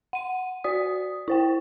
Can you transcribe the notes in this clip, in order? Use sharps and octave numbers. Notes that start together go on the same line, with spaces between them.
F#5 D#7
F#4 D5 D#6
E4 C5 G5